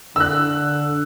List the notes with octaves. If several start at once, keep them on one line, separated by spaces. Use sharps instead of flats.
D3 E6 F#6